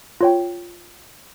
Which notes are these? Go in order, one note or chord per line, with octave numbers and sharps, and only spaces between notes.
F4 C#5 G5